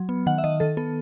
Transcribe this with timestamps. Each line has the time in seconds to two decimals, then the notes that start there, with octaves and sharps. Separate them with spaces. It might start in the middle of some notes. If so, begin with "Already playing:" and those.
Already playing: F#3
0.09 B3
0.26 D#3 F#5
0.38 E5
0.44 D#3 D#5
0.60 D#3 A4
0.77 B3 A4